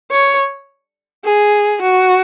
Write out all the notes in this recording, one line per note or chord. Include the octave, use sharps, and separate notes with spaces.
C#5
G#4
F#4